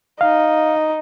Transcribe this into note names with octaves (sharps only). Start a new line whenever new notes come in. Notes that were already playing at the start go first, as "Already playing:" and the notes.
D#4 F5